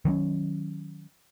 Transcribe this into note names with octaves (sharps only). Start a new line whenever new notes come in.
D#3 F#3 C4 C#4